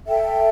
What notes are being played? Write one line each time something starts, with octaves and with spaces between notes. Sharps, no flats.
A4 E5 G5